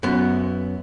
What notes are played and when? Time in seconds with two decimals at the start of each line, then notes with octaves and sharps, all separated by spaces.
0.03 F#2 B3